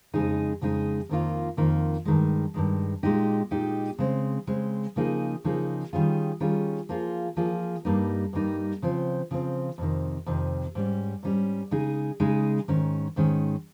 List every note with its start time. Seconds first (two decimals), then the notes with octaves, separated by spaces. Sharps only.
0.14 F2 C#3 G#3 D#4 G#4
0.61 F2 C#3 G#3 D#4 G#4
1.09 F2 D#3 A#3 F4
1.57 F2 D#3 A#3 F4
2.05 G2 D#3 G#3
2.54 G2 D#3 G#3
3.03 A#2 G#3 D#4 G4
3.51 A#2 G#3 D#4 G4
3.98 C#3 G#3 C4
4.47 C#3 G#3 C4
4.96 C#3 F3 A#3 D#4 G#4
5.44 C#3 F3 A#3 D#4 G#4
5.93 D#3 G3 C#4 F4 G#4
6.40 D#3 G3 C#4 F4 G#4
6.89 F3 A#3 F4 G#4
7.37 F3 A#3 F4 G#4
7.85 G2 G3 A#3 D#4
8.33 G2 G3 A#3 D#4
8.82 C#3 F3 C4
9.31 C#3 F3 C4
9.78 F2 C3 D#3
10.26 F2 C3 D#3
10.75 G#2 G3 C#4
11.23 G#2 G3 C#4
11.71 C#3 G#3 D#4 G#4
12.20 C#3 G#3 D#4 G#4
12.68 G#2 D#3 G#3 C#4
13.16 G#2 D#3 G#3 C#4